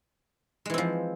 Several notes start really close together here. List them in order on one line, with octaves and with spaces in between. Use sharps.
G#3 E3 C4 F3